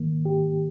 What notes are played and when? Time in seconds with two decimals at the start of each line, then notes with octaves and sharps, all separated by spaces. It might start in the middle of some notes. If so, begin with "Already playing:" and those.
Already playing: G#2 D#3 A#3
0.25 G#2 G4